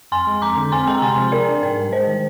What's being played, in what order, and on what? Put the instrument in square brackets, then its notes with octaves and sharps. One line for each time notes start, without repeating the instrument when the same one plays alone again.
[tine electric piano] F2 [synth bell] G#5 C6
[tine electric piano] G#3
[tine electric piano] F2 [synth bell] A#5 D6
[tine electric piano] D3
[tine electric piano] C4 [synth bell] G#5 C6
[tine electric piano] G#3 [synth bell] G5 A#5
[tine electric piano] C3 [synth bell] G#5 C6
[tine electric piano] F3
[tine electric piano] G#4 [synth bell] A#4 D5
[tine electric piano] D4
[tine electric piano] G#2 [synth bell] A#4
[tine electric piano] G3
[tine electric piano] G#3 [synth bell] C5
[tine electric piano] D#3